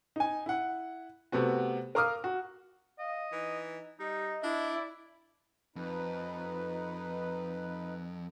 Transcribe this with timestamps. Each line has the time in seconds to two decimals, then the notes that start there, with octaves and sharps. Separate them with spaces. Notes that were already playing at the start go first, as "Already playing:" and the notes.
0.16 D#4 G#5
0.46 E4 F#5
1.32 C3 A3 B3 F#4
1.95 A#4 F5 A#5 D6 D#6 F6
2.24 F#4
2.99 D#5 F5
3.32 E3 D#4
4.00 G3 D#4 D#5
4.43 D4 E4 D5
5.76 F2 D#4 B4